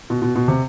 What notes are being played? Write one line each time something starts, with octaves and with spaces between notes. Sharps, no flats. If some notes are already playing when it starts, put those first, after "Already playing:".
B2
B2
B2
C3